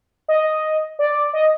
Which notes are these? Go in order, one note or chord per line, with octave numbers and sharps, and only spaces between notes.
D#5
D5
D#5